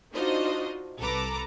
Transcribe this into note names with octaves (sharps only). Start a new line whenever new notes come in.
D4 D#4 F4 F#4 C5 D#5
C2 A4 B4 A#5 D6